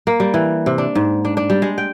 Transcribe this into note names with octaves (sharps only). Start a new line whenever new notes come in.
A#3
G3
E3
C3
D4
G#2
D4
D4
G3
G#3
G5